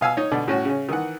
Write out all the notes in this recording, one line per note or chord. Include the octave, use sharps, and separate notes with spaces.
B2 F5 G#5 E6
D#4 C#5
B2 D3 D5
A2 C#4 F#4
C#3 C#4
D#3 E3 F#5